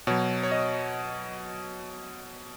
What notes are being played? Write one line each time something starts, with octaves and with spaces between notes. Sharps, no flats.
B2 F#3 C#5
C#5
D#5